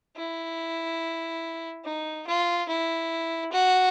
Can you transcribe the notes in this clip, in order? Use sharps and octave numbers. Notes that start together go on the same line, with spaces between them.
E4
D#4
F4
E4
F#4